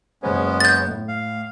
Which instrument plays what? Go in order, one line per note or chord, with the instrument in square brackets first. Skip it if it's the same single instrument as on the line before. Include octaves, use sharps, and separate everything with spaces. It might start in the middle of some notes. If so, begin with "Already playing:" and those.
[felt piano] F#1 C5 [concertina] G#3 B3 C#4
[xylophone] G6 A6
[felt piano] A2
[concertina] F5